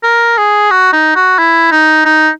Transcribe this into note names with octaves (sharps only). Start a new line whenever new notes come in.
A#4
G#4
F#4
D#4
F#4
E4
D#4
D#4